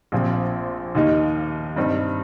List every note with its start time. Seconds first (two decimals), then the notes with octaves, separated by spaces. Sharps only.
0.12 A#1 A#2 F3 C4
0.95 D#2 D#3 A#3 D#4
1.76 G2 G3 C4 D#4